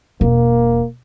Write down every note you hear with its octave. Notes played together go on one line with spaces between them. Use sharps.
E1 A#3